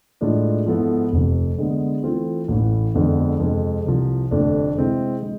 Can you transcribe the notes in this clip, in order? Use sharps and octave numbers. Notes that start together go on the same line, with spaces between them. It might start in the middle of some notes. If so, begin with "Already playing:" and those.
A2 G#3 D4 F4
G#2 F3 B3 E4 A4
F1 F2 C3
D3 G#3 B3
E3 A3 C4 F4
A1 A2 E3
F2 D3 G#3 B3
F2 C3 G#3
C2 C3 F3
F1 F2 D3 A3 D4
C3 G#3 C4 E4
G#3